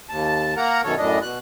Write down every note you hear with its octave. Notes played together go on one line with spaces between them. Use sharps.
D#2 A5
A#3 A#4 F#5 A#5
F#2 B2 D#3 A4 C#5
F#2 A2 D4 D#5
B2 F#6